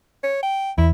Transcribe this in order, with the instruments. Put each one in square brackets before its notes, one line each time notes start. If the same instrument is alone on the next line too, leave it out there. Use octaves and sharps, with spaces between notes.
[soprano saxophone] C#5
G5
[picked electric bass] E2 [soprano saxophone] E4